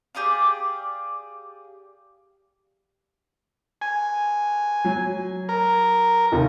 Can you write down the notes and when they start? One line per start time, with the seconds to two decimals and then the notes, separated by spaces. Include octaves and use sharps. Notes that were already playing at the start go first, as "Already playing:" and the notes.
0.15 G4 G#4 D5 F5
3.82 G#5
4.84 F#3
5.49 A#4
6.32 D#2 C3 D#3